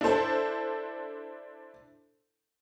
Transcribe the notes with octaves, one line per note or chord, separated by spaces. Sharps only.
D4 E4 A4 C5 A5